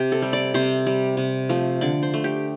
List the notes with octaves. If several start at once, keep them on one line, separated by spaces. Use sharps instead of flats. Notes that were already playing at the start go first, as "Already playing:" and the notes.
Already playing: C3 G4
A4
G3
D5
C3 C5
G3
C3
F3 A3
D3 D5
C5
A3
G4